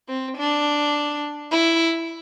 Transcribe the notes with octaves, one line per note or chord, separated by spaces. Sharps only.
C4
D4
E4